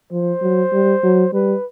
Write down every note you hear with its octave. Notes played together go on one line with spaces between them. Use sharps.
F3 C5
F#3
G3
F#3
G3 B4